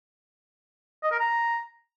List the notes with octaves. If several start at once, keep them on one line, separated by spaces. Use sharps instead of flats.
D#5
A#4
A#5